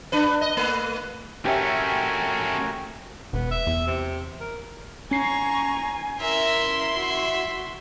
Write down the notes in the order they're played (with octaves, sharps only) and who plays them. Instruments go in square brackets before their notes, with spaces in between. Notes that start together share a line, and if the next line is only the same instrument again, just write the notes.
[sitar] D4 B4
D#5
A3 B4
[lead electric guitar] A3 C#4 [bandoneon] F#4 A#4 G#5 [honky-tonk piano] G4 C#5 E5
[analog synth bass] E1 [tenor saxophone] B3
[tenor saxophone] E5
[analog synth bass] E2
[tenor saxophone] C3
A#4
[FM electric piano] C#4 C7 [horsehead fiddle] G#5 [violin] A#5 C#6
[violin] E4 C6 [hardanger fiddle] A#4 E5
[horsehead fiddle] F#4 [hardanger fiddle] E5